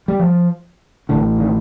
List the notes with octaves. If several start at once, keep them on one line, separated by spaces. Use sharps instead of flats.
G3
F3
A1 A2 D3
D#3